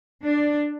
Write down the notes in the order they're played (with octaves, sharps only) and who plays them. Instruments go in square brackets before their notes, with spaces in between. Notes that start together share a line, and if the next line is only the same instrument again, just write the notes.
[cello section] D4